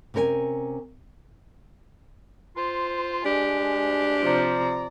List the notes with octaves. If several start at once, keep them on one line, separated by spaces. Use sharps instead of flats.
C3 C#4 A#4 B4 G#5
F4 C5
G#3 D4 G4
C3 F3 D5 A#5